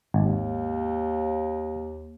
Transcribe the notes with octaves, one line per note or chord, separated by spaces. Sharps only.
G#1 D#2